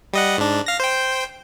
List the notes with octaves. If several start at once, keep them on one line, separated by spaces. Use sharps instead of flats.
G3 D#5 F#5
G#2 D4
F5 A#6
C5 G5